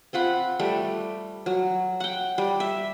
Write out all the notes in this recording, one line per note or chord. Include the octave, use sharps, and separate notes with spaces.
C4 F4 F#5 B5
G3 A3
F#3
F#5 G5
G3
E5